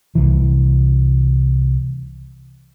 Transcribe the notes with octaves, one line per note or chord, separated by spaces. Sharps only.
C2 E3